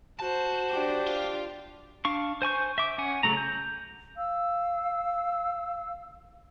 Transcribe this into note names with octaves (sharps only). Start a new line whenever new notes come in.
F#4 C5 A5
D4 G4
F4
D4 F5 C#6
C5 G#5 C#6 G6
E5 D6
C#4 F#5 G#5
C#3 F3 F#3 A3 A#5
G6
F5 E6